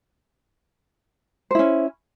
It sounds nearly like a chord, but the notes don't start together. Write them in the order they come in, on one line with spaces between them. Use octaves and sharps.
C5 E4 C#4